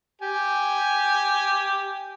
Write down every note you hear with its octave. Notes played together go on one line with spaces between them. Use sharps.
G4 G#5